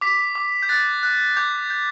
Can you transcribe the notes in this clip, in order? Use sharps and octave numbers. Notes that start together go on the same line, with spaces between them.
D6 B6
D6
G6
F#6 A6
F#6
D6 G6
G6